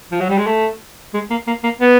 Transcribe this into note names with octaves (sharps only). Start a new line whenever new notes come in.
F3
F#3
G3
G#3
A3
G#3
A#3
A#3
A#3
B3